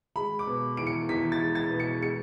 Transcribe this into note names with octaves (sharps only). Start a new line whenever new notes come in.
G#3 B5
D6
B2
E2 D7
C#7
E2 B6
A6
G#3
A6
B2
C#7
G#3 C#7